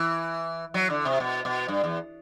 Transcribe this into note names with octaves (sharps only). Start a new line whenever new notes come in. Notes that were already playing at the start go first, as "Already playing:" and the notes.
Already playing: E3
F#3
D3
C3
B2
B2
G2
E2